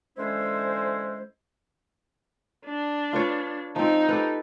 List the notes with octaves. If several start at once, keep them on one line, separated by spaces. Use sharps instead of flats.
D3 E3 G#3 C#4 E4 C5
D4
F4 B4 C#5
F3 C4 D#4
G4 A4 B4